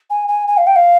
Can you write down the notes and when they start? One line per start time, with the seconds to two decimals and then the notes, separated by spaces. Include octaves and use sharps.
0.10 G#5
0.28 G#5
0.47 G#5
0.57 F5
0.67 G5
0.76 F5